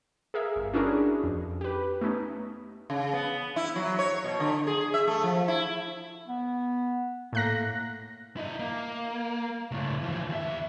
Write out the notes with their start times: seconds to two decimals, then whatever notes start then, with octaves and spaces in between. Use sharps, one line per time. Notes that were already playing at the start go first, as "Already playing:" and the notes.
0.34 G#4 A#4 E5 F5
0.56 G1
0.74 C#4 D4 E4 F#4 G#4 A#4
1.24 F2
1.61 G4 B4
2.01 A3 B3 C#4 D#4
2.90 C#3
3.13 B3
3.56 E4
3.76 F#3
3.99 C#5
4.24 B2
4.40 D3
4.67 G#4
4.94 E5
5.08 A3
5.23 F3
5.48 E4
6.28 B3
7.33 A2 A#3 F#6 A#6
8.37 E4 D#5
8.59 A#3
9.71 C#2 A2
10.01 E3 F3
10.29 D#2 E5